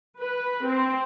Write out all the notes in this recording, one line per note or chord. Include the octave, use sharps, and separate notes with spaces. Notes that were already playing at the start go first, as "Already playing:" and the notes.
B4
C4